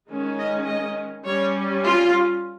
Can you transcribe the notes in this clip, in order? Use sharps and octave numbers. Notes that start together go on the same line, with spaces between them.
D#3 G#3 C#4
D#5
D#5
G3 C#4 C#5
F4